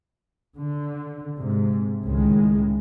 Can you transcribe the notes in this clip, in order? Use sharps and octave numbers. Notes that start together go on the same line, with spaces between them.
D3
G#2 C3
C#2 A2 D#3 G#3